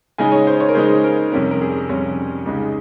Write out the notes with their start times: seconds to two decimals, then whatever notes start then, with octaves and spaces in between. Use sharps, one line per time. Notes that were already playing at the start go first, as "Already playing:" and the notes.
0.18 C#3 G#3 D#4 G#5
0.32 C#5
0.47 C5
0.60 C#5
0.69 A#4
0.75 C#3 G#3 D#4 C5
1.04 A#4
1.32 F2 C3 G3 C#4 A#4
1.51 A#4
1.61 G#4
1.89 F2 C3 G3 C#4
2.46 C#2 C#3 G#3 D#4